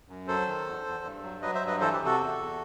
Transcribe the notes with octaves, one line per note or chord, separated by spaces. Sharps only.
F#2
F#3 A4 C5
D#3
E2
E2
G2
F#3
F#3 B4 D#5
C5 E5
G2
B4 D#5
E3 A4 C5
G4 B4
C3
F#4 A4
E2
E2